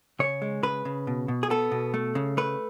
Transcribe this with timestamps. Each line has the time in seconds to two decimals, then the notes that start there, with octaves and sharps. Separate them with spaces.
0.19 C#3 C#5
0.42 G#3
0.63 C#3 B4
0.85 C#3
1.07 B2
1.28 B2
1.43 G#4
1.50 B3 A4
1.71 B2
1.94 A3
2.15 C#3
2.37 A3 B4